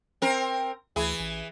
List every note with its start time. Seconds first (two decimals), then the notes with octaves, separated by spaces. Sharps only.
0.22 C4 A#4
0.96 D2 E3 E4 G#4
1.20 A1